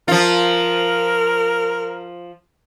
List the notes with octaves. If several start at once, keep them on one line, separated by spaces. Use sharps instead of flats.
F3 F4 A#4